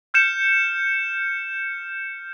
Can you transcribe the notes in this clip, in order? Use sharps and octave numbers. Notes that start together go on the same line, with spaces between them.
F6 G6 C#7 E7